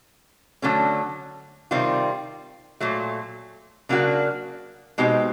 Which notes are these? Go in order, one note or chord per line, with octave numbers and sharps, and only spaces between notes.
D3 F#3 A3 C#4
C3 D#3 G3 C4 F4
A#2 F#3 A3
C#3 F#3 A#3 D4 F#4
B2 G#3 C4 D#4 G4